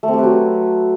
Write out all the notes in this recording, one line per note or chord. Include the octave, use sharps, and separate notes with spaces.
A3
C4
G4
B4
F#3